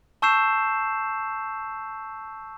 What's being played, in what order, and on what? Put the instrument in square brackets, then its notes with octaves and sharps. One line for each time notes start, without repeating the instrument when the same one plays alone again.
[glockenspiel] A5 C#6 E6 G6 C7 E7